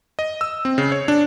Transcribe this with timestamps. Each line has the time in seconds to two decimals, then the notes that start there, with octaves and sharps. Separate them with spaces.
0.19 D#5
0.41 E6
0.65 C4
0.78 C#3
0.92 C#5
1.08 D4